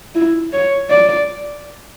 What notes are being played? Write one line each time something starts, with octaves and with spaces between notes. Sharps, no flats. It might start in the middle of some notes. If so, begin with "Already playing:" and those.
E4
C#5
D5